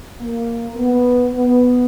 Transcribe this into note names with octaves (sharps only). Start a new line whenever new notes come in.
A#3
B3
B3